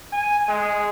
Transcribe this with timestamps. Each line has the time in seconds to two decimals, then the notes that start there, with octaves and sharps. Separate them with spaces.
0.13 G#5
0.48 G#3